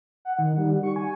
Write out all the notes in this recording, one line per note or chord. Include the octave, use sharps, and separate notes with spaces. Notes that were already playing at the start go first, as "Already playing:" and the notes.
F#5
D#3
G3
C#6
G#5